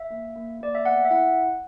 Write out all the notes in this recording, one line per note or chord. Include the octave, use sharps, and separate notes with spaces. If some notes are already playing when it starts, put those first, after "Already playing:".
Already playing: E5
A#3
A#3
A#3 D5
E5
B3 F#5
E5
E4 F#5